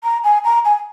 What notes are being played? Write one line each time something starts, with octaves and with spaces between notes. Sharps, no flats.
A#5
G#5
A#5
G#5